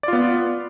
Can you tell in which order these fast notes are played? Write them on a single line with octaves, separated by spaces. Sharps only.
D5 F4 B3